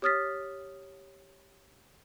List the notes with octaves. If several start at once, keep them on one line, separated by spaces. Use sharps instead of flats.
G4 C#5 D#6 F6 A6 B6